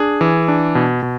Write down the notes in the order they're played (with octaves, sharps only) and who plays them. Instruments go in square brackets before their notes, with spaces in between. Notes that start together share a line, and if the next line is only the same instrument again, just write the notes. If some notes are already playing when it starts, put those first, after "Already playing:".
Already playing: [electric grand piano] D4 G#4
E3
D4
B2
B2